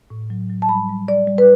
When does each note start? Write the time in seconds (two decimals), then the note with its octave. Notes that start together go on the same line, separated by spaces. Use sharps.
0.10 A2
0.30 F#3
0.50 F#3
0.62 A5
0.69 G3 B5
0.89 G3
1.08 G3 D5
1.28 G3
1.38 B4